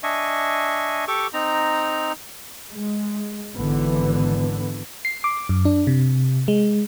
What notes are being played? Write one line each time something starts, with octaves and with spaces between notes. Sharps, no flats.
D4 D#5 E5 G#5 C#6
G4 A4 C#6 D6
C4 D#4 A#5
G#3
G#1 D3 E3 B3
C7
D6
F#2
D4
C3
G#3